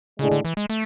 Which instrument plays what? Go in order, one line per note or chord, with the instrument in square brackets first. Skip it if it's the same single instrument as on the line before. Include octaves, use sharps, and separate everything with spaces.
[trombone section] A2 G#3 D4 G#4 [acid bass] C#3
[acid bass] D3
E3
G#3
A3